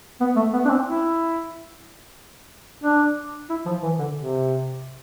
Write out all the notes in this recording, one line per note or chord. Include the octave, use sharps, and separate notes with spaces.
B3
A3
B3
D4
C4
E4
D4
E4
F3
E3
D3
C3